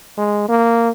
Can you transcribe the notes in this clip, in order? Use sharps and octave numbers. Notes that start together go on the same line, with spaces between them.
G#3
A#3